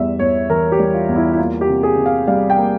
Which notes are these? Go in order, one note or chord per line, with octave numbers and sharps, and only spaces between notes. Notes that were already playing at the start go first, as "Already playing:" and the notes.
Already playing: E2 G3 E5
E2 C#5
E3 A#4
G4
G3
F4
E2
E4
E4
A#3 F4
G4
C3
G#4
C3
F5
G3 F5
G5
A#3